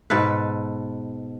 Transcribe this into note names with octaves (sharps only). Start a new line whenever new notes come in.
G#2 B2 A4 B4